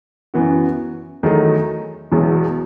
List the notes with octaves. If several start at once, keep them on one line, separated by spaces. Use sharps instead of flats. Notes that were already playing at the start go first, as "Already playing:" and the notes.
F#2 E3 B3 F#4
E2 D#3 F#3 A3 D#4
E1 E2 B2 F#3